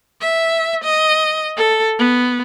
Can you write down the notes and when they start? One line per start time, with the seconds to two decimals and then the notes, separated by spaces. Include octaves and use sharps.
0.21 E5
0.83 D#5
1.57 A4
1.98 B3